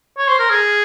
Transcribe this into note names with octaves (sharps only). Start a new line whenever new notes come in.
C#5
C5
A#4
G#4